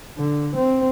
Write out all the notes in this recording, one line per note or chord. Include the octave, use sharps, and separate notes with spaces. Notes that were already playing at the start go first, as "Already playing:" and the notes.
D3
C4